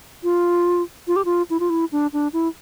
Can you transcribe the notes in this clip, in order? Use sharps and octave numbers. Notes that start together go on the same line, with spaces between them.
F4
F4
G4
F4
E4
F4
E4
D4
D4
E4